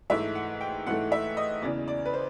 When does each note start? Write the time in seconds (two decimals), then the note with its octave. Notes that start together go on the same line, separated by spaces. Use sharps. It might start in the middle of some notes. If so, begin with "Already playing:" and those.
0.10 G#2 E3 A3 E5
0.35 F#5
0.60 G5
0.86 G#2 E3 A3 F#5
1.12 E5
1.37 D#5
1.62 E2 C#3 E3 D5
1.88 D5
2.05 B4
2.14 C5